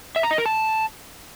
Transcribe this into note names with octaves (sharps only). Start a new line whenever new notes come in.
E5
A#5
D#5
A#4
A5